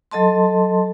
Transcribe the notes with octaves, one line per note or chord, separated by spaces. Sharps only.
F#3 A4 D#5 A5 C6